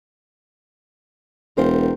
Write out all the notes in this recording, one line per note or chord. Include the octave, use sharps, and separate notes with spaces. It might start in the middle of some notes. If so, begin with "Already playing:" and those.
E1 A#4 C5 G5